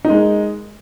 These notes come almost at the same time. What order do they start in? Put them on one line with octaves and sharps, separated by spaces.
D#4 A#3 G#3